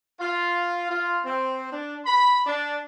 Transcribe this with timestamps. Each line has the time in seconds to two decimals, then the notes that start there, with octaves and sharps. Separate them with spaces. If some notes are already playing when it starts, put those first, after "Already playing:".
0.19 F4
0.90 F4
1.24 C4
1.71 D4
2.05 B5
2.46 D4